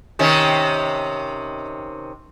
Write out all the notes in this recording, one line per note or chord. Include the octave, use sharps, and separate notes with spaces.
C3 D#3 C#4